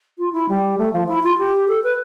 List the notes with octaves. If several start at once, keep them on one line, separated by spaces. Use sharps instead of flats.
F4
E4
G3
A3
F3
E4
F4
G4
A4
B4